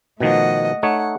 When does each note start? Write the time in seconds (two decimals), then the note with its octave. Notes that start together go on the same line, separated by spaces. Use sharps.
0.20 B2 D#3 F3 A3 D#5 F#5
0.83 A3 D#4 C#5 F#5